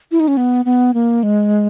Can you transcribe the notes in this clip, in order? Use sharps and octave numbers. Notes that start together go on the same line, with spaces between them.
E4
D#4
C#4
B3
B3
A#3
G#3